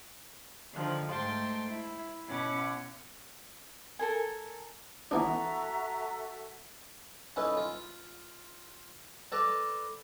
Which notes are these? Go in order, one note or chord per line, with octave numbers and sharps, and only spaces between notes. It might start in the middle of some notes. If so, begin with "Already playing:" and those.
D3 D#3 F3
G#2 A3 G5 A5 C6
E4
B2 C#4 E4 F#5 D6
A4 A#4 G#5
E3 B3 D4 F#4 A4 E5 A#5
C#4 D#4 E4 A4 B4
F4
A4 B4 D5 A5 A#5